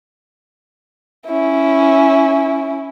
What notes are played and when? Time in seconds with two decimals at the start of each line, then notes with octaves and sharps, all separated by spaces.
1.27 C#4 E4